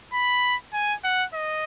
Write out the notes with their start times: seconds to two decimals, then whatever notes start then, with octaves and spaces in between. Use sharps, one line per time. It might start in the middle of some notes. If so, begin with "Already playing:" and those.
0.13 B5
0.73 G#5
1.04 F#5
1.34 D#5